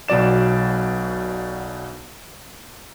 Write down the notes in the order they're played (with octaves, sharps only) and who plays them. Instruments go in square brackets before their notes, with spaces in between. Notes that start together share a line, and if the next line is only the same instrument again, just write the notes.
[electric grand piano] B1 B2 F#3 D5 E7